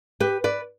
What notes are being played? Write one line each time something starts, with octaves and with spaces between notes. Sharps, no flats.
G4 B4
B4 D5